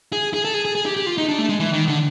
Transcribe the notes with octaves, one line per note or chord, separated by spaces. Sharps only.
G#4
G#4
A4
G#4
G#4
G#4
G4
G4
F4
D#4
D4
A3
G#3
E3
D#3
D3